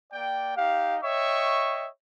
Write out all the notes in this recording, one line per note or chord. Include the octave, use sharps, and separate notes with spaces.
A#3 D5 G5
D#4 G4 F5
C#5 D#5 E5 G5 C#6